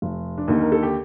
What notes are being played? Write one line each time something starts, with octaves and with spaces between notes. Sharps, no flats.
F1
D4
D#2 D3 D#4
A#4
A4
G4